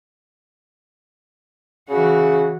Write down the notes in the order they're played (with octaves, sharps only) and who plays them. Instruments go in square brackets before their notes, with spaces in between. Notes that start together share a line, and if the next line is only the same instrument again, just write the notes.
[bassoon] C#3 [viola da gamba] E3 F#4